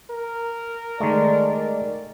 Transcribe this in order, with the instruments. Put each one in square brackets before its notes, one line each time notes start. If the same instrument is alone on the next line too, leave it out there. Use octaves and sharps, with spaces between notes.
[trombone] A#4
[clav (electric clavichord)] D#3 G#3 A3 [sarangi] D5